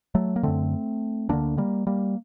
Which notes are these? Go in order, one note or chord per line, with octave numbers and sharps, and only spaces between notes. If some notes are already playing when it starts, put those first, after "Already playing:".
F#3 A3
A#3
F#2 D3 A3 C4
D2 D3 A#3 D4
G3 A#3
G3 A#3